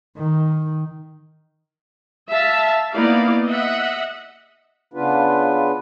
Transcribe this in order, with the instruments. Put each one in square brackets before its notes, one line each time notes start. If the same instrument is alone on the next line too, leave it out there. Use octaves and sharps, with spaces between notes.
[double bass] D#3
[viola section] E5 F5 A5
A#3 B3 D#4 E4 D5 F5
D#5 E5 F#5
[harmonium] C#3 B3 D4 F4 B4